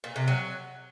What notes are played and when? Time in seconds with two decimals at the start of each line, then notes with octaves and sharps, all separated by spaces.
0.04 A#2
0.16 C3
0.28 F#3